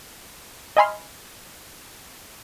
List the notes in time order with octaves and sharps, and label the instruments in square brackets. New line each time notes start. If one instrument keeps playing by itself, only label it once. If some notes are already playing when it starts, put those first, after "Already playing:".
[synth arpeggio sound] D#5 E5 G#5 B5 C6 F6